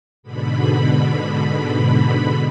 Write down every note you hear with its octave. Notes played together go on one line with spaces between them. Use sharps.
G#2 B2 D3 B5